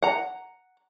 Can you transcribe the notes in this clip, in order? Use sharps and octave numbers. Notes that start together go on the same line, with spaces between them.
F#5 A#5